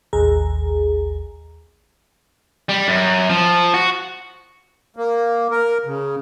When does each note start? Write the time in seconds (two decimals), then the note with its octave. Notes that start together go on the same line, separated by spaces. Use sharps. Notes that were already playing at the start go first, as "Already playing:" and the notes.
0.13 A1 D#2 G#4 A#5
2.69 G3
2.88 F#2
3.29 F3
3.74 F#4
4.97 A#3
5.51 A#4
5.86 C#3